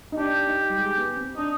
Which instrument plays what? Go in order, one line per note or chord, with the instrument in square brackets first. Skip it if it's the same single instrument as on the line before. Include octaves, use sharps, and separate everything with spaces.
[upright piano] D#4
[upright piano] D4 [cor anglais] G4
[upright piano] D#4
G3
G#3
B3
C4
[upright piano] D4 [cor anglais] D#4